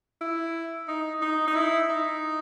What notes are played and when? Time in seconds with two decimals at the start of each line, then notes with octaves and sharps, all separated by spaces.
0.21 E4
0.88 D#4
1.22 D#4
1.47 D#4
1.56 E4
1.89 D#4